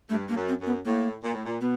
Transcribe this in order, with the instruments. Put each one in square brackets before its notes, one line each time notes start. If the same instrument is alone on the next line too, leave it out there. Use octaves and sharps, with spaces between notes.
[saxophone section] G2 [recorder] A3
[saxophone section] G2 [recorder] A#3
[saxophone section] F#2
[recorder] C4
[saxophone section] F#2
[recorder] B3
[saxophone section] A2 [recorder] A#3
[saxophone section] A#2
A2
A#2
[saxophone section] B2 [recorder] B3